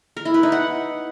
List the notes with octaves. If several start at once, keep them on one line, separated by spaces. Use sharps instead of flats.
A#4
E4
B4
D#4
F#5